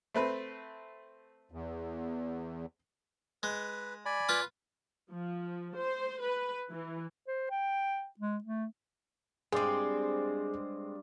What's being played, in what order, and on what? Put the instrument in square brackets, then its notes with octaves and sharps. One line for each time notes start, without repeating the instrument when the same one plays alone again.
[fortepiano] A3 C4 B4
[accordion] E2
[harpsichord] G#3 [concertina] B4
[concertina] D5 G#5 B5
[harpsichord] F4 B4
[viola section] F3
C5
B4
E3
[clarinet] C5
G5
G#3
A3
[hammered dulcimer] G2 D5 [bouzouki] G#3 C4 [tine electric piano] G#4